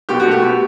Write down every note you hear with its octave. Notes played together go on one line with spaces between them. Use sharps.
B2 G4
F#4
A3
G4
B2